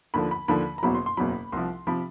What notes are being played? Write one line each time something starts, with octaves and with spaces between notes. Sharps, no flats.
D#2 D3 F3 B5
B5
D#2 D3 F3 B5
A#5
F#1 E2 B2 F#3 B5
C6
C6
F#1 E2 B2 F#3 B5
C2 C3 F3 C6
C3 F3 B5